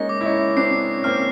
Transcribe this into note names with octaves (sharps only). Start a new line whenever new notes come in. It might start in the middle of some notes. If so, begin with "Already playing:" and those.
Already playing: G#3 A#3 C#4 D#4 A#6
D6
E4
C#4 D#4
C4 D4 C7
C#4
A#3 C4 F6